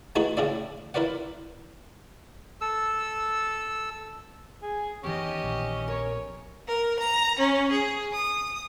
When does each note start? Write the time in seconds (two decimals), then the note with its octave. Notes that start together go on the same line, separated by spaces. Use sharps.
0.16 A3 D#4 E4 F#4 G#4 B4
0.37 A2 C#3 E4 D5
0.94 E4 A#4 B4 D5 F#5
2.61 A4 E6
4.62 G#4
5.04 E2 D#3 C#4 G4 D#5
5.44 A#1
5.88 A#4 C#5
6.68 A#4
6.99 A#5
7.38 C#4
7.71 G#4
8.13 D#6